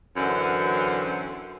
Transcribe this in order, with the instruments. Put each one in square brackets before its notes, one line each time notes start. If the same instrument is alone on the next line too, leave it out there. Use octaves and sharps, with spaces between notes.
[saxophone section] F#2 D3 E3 C4 C#4